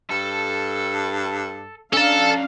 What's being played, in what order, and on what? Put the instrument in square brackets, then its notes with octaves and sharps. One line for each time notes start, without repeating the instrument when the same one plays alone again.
[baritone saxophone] G2 [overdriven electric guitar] A4
[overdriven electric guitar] C#4 A#5 [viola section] D4 F5 [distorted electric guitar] A4 A5